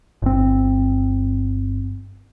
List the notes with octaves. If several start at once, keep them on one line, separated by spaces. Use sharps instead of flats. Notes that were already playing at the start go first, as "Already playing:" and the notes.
G1 C4